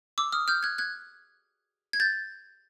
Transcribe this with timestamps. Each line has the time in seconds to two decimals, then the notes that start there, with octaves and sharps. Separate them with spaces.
0.18 D6 E6
0.32 D#6 F6
0.48 F6 G6
0.63 F#6 G#6
0.78 F#6 G#6
1.93 G#6
2.00 G6 A6